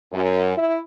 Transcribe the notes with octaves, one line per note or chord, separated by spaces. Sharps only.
F#2
E4